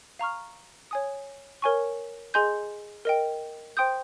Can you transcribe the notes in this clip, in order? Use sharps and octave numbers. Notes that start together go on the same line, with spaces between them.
F5 A#5 C#6 F6
C#5 G#5 D#6
A#4 C#5 G#5 C#6
G#4 D#5 G#5 C6 G6
A#4 D#5 G5
C5 G5 C6 D#6 G6